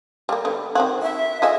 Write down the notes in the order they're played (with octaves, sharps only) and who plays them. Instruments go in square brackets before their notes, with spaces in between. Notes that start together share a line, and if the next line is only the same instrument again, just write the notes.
[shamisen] G3 A#3
D3 B3
D#3 C4 F#4
[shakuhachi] E5
[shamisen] F4 G#4 E5 [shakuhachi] D#5